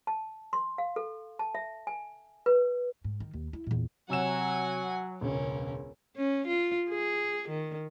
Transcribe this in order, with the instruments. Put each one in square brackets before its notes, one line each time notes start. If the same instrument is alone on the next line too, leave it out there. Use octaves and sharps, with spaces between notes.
[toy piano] A5
C6
F5
A4
A5
E5
G#5
B4
[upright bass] G#2
D#3
D#2
E4
E2 A#2
[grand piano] C3 E6 E7 [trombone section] F#3 [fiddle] F#5 G#5
[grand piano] E1 C#2 [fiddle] C#4 A#4
[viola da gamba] C#4
F4
G#4
D#3